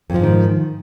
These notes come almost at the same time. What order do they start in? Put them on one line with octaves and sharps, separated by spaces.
F2 F3 G#2 D#3